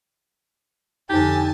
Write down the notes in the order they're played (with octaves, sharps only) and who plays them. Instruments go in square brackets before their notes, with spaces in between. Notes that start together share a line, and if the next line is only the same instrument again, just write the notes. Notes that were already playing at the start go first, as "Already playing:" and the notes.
[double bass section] F2 D3 [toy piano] D#4 C5 [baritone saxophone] G4 [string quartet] G#5 A5